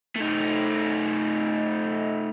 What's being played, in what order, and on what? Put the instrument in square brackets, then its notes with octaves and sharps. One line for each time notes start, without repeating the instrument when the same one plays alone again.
[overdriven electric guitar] A3 D#4